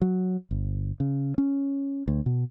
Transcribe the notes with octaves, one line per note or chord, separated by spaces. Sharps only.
F#3
G1
C#3
C#4
D2
B2